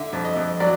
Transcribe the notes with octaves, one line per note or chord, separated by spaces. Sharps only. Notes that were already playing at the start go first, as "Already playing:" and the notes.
Already playing: D3 E5
F2
D#5
F2
F#3 D5